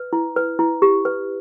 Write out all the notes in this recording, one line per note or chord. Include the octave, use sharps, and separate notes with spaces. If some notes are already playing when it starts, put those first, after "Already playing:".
Already playing: B4
E4
B4
E4
G4
B4